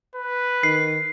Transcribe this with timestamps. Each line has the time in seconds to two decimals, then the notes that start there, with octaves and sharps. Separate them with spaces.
0.16 B4
0.63 D#3 C7